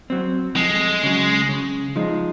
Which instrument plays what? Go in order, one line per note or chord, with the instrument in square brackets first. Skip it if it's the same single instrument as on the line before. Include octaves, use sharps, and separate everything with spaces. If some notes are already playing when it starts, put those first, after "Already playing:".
[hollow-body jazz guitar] F#3 C4
[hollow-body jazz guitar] F2 [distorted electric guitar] G#3
[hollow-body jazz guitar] C#3 F#3
C#3
F3 G#3 D#4